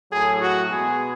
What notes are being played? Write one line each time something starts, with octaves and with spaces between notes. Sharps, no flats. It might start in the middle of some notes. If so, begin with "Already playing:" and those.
A2 F#3 A3 G#4
F#4
B2 G#3 B3 G#4